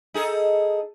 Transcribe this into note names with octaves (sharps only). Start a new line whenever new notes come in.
D#4 G#4 A4